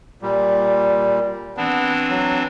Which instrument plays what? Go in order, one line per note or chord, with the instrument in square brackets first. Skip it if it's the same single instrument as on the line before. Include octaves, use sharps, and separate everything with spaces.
[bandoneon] A#2 G3
[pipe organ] E3 C4 D4 [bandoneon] B3
[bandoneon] F#3